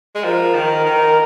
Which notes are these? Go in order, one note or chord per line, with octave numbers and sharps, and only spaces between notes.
G#3
F3 A#4
D#3
D#3 A#4